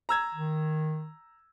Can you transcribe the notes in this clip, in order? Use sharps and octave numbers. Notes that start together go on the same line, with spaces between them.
A#5 E6 G#6
D#3